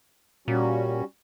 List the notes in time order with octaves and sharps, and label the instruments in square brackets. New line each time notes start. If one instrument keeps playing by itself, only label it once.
[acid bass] A#2 [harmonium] G3 C#4 F#4